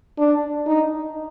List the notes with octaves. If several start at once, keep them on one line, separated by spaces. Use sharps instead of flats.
D4
D#4